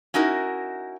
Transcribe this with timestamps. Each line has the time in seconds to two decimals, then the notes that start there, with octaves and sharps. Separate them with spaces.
0.14 C#4 D#4 E4 F#4 A#4